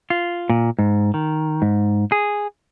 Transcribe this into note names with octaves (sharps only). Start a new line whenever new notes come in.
F4
A#2
G#2
D#3
G#2
G#4